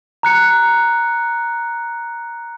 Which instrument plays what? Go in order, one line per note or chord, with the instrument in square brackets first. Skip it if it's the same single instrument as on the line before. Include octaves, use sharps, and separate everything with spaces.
[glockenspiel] A#5 F#6 C#7